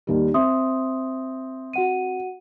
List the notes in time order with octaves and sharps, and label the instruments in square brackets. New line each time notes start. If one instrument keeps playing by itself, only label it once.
[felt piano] D#2 D#3 G3
[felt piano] C4 [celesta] E5 C6 D#6
[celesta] F#4 F#5 D#7